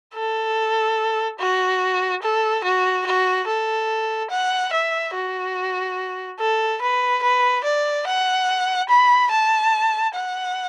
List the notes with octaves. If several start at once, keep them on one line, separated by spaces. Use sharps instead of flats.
A4
F#4
A4
F#4
F#4
A4
F#5
E5
F#4
A4
B4
B4
D5
F#5
B5
A5
F#5